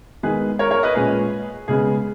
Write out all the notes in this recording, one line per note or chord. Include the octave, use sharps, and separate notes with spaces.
D#3 G#3 B3 G#4 B4
A#4 C#5
A#4 C#5
B4 D#5
A#2 G#3 C#4 G#4 B4
C#3 G#3 B3 G#4